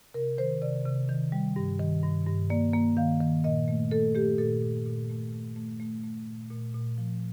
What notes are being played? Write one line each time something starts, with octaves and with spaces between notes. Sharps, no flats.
C3 A#4
D#3 C5
C3 D5
C3
D#3
G3
G2
D#3
G2
G2
A#3 D5
A#3
D#3 F5
D#3
A#2 D#5
A3
A3 A4
A3 G4
A#2 A4
A#2
A#2
A3
A3
A3
A3
A3
A#2
A#2
A#2
F3